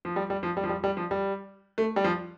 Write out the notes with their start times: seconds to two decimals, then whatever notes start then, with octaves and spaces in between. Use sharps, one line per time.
0.05 F3
0.16 G3
0.30 G3
0.43 F3
0.57 G3
0.64 F3
0.69 G3
0.84 G3
0.97 F3
1.11 G3
1.78 A3
1.96 G3
2.04 F3